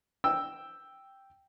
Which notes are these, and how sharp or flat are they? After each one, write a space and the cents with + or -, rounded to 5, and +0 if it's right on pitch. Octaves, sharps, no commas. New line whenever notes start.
G5 +0 E6 +0